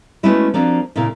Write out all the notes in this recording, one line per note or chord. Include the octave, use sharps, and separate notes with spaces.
G#3 A3 B3 C#4 E4 F#4
F3 A#3 C4 D4 F#4
A#2 C#3 A#3 E4